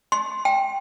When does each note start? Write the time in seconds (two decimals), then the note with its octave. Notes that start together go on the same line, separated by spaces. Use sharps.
0.12 C6
0.45 G5